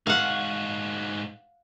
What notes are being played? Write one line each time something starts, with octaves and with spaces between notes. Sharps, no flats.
G#2 F#4 F5 F#5